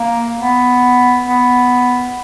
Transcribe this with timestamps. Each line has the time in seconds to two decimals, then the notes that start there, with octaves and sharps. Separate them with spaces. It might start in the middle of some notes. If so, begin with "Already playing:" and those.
Already playing: A#3
0.40 B3
1.27 B3